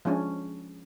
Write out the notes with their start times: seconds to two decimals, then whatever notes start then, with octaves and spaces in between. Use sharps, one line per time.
0.05 F3 G#3 C#4 D4